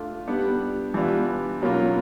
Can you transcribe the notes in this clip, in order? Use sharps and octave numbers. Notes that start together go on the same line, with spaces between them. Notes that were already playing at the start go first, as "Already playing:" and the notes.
Already playing: A3 D4 F4
G3 B3 D4
E3 G3 B3 D4 F4
B2 F#3 A#3 C#4 F4